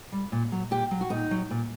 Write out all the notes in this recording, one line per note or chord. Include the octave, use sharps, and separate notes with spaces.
G3
A#2
F#3
A#2 G4
F#3
F#4
A#2 D#4
F#3
A#2